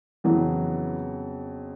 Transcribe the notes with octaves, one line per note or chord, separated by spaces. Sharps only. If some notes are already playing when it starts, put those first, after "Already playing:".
F2 C#3 E3 F#3 B3